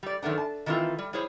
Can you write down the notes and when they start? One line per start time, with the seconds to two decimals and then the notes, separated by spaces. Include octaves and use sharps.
0.03 G3 D5
0.22 F#2 D#3 A3 B3 D4
0.37 A5
0.66 D#3 E3 A3 C4 F4
0.99 G3
1.13 G3 E4 G#4 C5 C#5